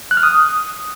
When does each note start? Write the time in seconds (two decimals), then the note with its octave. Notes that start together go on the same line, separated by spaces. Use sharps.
0.11 F#6
0.17 F6
0.23 D#6